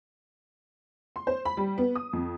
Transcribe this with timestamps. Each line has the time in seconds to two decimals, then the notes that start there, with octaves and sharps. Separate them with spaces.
1.16 C6
1.27 C5
1.45 B5
1.57 G3
1.78 B3
1.95 D#6
2.13 F2